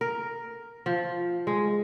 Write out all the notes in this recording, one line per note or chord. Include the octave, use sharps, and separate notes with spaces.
A#4
F3
G#3